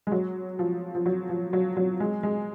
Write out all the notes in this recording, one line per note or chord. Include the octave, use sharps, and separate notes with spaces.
G#3
F#3
F3
F3
F#3
F3
F#3
F#3
G#3
G#3